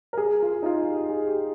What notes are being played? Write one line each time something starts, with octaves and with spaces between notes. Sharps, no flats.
A#4
G#4
F4
D#4
F4
G4
G#4
G4